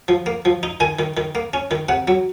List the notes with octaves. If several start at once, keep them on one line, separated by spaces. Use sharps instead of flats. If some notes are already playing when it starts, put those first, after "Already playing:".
F3
A#3
F3
D#4
D#3 G#5
D#3
D#3
A#3
C#4
D#3
C3 F#5
F#3